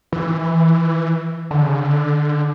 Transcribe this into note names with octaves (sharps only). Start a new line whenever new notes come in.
E3
D3
C#3
D3